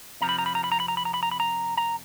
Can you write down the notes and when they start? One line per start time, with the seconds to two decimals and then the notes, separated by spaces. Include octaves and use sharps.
0.21 F2 C3 F3 A#5
0.29 B5
0.39 A#5
0.46 B5
0.55 A#5
0.64 B5
0.72 A#5
0.80 B5
0.88 A#5
0.97 B5
1.05 A#5
1.14 B5
1.23 A#5
1.31 B5
1.40 A#5
1.77 A#5